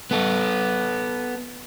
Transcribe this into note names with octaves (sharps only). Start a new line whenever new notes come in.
B3 A4